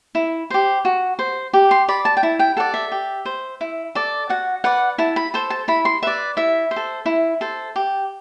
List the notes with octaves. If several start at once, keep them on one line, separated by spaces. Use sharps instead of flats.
E4
G4 C5
F#4
C5
G4
C6
D5 B5
A5
G5
E4 A5
G5
A4 D5 F#5
E5
G4
C5
E4
A4 D5
F#4 F#5
B4 D5 F#5
E4 A5
B5
A4 C5
A5
E4 B5
C6
B4 D5 E5
E4 E5
C5
A4
E4
A4 C5
G4